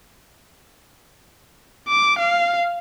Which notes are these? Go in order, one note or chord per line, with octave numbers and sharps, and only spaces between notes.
D6
F5